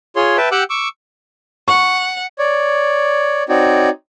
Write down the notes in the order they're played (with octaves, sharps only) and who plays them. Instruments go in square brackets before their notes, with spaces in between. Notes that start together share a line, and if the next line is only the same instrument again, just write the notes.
[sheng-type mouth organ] F4 G#4 C#5 C6
B4 E5 G5 A5
G4 F#5 G5 D6 E6 F#6
C#6 D6 E6
[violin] F#5 [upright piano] C#6
[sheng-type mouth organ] C#5 D5
C4 D#4 F#4 C#5 D5